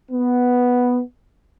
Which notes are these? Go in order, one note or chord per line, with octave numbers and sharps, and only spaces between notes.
B3